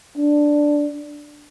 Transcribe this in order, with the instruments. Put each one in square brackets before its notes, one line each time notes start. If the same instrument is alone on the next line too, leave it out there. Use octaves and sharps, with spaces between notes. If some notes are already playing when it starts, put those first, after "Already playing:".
[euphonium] D4